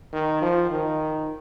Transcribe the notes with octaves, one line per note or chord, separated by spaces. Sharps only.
D#3
F3
D#3